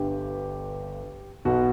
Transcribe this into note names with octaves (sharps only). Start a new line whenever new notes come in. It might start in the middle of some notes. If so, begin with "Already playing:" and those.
Already playing: G1 G2 D3 G4
B1 B2 F#4